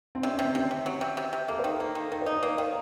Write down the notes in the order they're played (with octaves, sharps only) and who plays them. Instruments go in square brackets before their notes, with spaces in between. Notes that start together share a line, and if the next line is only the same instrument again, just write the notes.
[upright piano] C4
[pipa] C3 [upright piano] C#4
[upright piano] C#4
[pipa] C3
[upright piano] C4
[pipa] C3 [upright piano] C#4
[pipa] C3
F#3
C3
C3
C3
[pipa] A#3 [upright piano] A4
[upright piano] C5
[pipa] D#3
[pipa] A#3 [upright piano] A4
[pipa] D#3
[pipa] D#3 [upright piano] A#4
[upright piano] C5
[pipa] D#4
[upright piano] C#5
[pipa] A#3 [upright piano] C5
[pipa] D#3 [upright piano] C#5